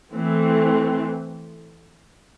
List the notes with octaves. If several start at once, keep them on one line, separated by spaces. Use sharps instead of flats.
E3 A3 C4